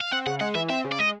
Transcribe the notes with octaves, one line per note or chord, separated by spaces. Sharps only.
F5
C4 F#5
C#3 F#5
G#3 F#5
E3 E5
C4 E5
C#3
D5
G#3 D#5